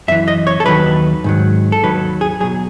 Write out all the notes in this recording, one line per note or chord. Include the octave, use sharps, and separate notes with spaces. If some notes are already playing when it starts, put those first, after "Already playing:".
F#2 E3 E5
D#5
C#5
A4
D#2 D#3 F#3 B4
G#2 D#3 F#3
A4
D#2 D#3 F#3 B4
G#4
B2 F#3 G#4